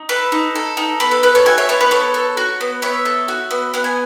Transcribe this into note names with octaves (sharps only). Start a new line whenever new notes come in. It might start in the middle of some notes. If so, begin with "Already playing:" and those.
Already playing: D#4
A4 B4
D#4
A4
D#4
B3 B4
A4
A4 B4
A4 C#5
F#4 E5 G#5
C#5 E5
B3 A4 C#5
B4
B3 A4 C#5
A4
F#4
B3
B3 C#5 E5
A4
F#4
B3
B3 F#5
G#5